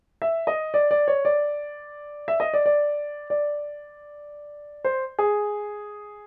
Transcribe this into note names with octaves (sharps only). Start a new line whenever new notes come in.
E5
D#5
D5
D5
C#5
D5
E5
D#5
D5
D5
D5
C5
G#4